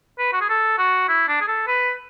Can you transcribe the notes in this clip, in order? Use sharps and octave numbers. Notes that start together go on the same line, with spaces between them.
B4
F#4
G#4
A4
F#4
E4
D4
G#4
A4
B4